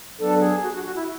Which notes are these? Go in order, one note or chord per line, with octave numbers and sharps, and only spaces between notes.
F#3 B3 D4 A4
G#4
F#4
F#4
F#4
E4